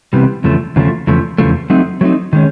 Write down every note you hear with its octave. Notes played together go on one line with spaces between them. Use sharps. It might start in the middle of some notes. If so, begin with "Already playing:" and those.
C3 E3 G3 B3
E2 C#3 F3 A3
E2 C#3 F3 A3
E2 C#3 F3 A3
E2 C#3 F3 A3
F#3 A3 C4 D#4
F#3 A3 C4 D#4
D#3 G#3 C#4